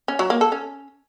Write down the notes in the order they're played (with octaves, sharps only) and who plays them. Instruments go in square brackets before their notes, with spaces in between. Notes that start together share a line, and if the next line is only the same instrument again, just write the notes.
[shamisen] C#4
F#3
A#3
A4
C#4